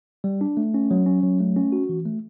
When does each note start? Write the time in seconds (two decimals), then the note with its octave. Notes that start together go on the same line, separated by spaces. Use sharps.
0.24 G3
0.41 D4
0.57 A3
0.74 C#4
0.91 F#3
1.06 C#4
1.23 F#3
1.40 A3
1.56 C#4
1.72 F#4
1.89 E3
2.05 A3